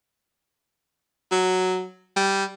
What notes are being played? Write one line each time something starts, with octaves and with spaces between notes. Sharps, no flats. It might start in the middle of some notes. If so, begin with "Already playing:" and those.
F#3
G3